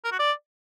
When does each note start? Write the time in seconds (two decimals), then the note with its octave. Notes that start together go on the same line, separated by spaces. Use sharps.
0.04 A#4
0.12 F#4
0.19 D5